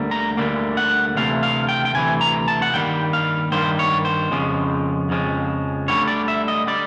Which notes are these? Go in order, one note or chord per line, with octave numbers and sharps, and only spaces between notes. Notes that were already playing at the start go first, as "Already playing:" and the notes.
Already playing: D2 D3 G3 A#3
A#5
D2 D3 G3 A#3
F#5
D2 C3 E3 A3 F5
F5
G5
G5
D2 C3 E3 A3 G#5
A#5
A5
F#5
G2 D#3 G3 A#3 G5
F5
G2 D#3 G3 A#3 C5
C#5
C5
F2 C#3 F3 G#3
F2 C#3 F3 G#3
D2 D3 G3 C#5
D5
E5
D#5
D3 G3 D5